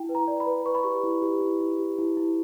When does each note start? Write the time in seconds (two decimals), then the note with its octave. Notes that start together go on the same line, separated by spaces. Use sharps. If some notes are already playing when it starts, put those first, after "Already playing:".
Already playing: E4 G5
0.09 B4
0.15 A#5
0.28 D5
0.40 B5
0.46 B4
0.65 B4 C#6
0.75 B5
0.83 G4 C#6
1.04 E4
1.22 G4
1.41 E4
1.60 E4
1.79 G4
1.98 E4
2.17 E4